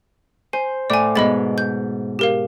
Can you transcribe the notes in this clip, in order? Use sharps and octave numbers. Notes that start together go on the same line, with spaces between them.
C5 G#5
A2 D5 G#5 D6
G#2 B2 D#5 B5 A6
G6
G4 A#4 F5